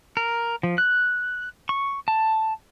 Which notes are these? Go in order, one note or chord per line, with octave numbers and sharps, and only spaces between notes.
A#4
F3
F#6
C#6
A5